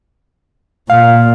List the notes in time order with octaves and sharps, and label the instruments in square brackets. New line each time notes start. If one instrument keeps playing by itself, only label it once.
[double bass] A#2 [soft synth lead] F5